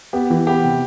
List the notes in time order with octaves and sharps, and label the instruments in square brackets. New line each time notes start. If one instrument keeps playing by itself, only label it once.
[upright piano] B3 [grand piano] G4
[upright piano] E3
[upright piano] B3 [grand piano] G4
[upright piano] C3